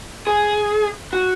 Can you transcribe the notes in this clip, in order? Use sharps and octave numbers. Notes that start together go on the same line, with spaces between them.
G#4
F#4